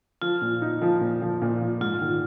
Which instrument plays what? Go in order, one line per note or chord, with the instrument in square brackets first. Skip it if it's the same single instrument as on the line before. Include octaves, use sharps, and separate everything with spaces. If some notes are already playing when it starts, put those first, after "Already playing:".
[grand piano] F3 [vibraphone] F4
[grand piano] A#2
D#4
F3
A#2
F3
A#2
F3
[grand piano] G#2 [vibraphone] F4
[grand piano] D#3